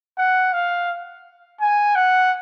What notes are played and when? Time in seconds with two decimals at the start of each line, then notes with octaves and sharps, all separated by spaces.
0.17 F#5
0.53 F5
1.60 G#5
1.96 F#5